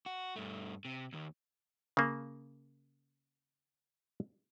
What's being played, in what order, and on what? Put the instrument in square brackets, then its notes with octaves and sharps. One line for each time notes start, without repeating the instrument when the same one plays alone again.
[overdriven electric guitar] F#4
G2 A3
C3
D#2 D#3
[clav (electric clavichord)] C#3 A#3